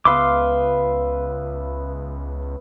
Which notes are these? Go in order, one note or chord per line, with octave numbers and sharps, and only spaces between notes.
C#2 B3 B4 E5 F5 C6 D6